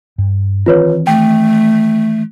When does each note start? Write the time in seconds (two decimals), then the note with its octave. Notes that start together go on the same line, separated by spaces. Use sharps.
0.18 G2
0.66 D#3 E3 C4 F4 B4 C#5
1.07 A3 G5